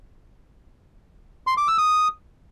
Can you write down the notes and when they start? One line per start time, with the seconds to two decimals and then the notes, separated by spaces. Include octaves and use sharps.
1.47 C6
1.57 D6
1.68 E6
1.78 D#6